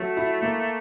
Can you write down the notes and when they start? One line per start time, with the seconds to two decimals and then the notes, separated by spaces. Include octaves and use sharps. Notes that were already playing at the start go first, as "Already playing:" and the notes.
Already playing: F#3 A3
0.17 E4
0.42 A#3